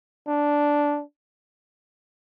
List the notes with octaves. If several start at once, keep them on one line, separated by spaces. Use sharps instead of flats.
D4